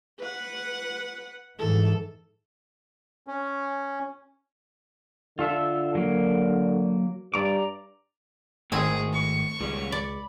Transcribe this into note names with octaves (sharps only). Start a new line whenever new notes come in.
B4 F#5
G#2 E3 A4
C#4
D3 F4 A4 E5
F#3 A#3
G2 D5 A#5 D6
G#1 A2 D#3 C4 G#4 G#5
C#6
C#2 G3 C#4
D5 B5